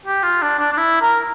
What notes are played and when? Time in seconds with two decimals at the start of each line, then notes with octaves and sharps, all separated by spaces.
0.06 G4
0.23 F4
0.42 D4
0.59 D4
0.72 D4
0.77 E4
1.01 A#4